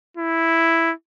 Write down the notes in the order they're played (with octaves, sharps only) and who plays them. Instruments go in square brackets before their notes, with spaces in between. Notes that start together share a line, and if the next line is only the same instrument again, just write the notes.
[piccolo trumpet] E4